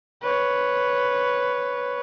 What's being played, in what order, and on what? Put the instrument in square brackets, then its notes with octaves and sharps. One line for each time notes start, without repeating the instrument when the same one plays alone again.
[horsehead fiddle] B4 C#5